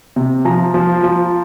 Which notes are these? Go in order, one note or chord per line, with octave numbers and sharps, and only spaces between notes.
C3
F3 A#5
F3
F3